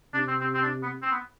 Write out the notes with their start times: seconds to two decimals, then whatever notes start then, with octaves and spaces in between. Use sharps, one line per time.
0.14 C3 D4
0.28 C4
0.40 C4
0.54 C4
0.63 D4
0.83 B3
1.02 C4
1.12 B3